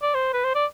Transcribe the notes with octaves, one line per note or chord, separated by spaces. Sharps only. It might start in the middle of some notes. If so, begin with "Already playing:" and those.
D5
C5
B4
C5
D5